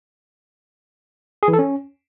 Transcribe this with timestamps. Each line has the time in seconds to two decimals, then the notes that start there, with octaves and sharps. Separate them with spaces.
1.43 G#4
1.48 E3
1.53 A4
1.59 C#4